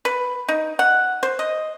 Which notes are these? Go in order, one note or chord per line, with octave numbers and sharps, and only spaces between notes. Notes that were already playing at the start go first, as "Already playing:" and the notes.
B4
D#4
F#5
C5
D#5